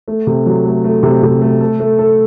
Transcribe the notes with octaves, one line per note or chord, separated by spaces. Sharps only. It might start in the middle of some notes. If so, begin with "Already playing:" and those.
A3
C3
F#3
A3
A3
C3
C3
A3
A4
A3
A4